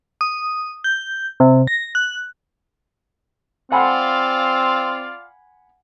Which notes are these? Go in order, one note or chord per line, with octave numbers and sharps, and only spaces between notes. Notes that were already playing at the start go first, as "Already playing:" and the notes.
D#6
G6
C3
A#6
F#6
C4 F4 D5 F5 F#5 G#5 B5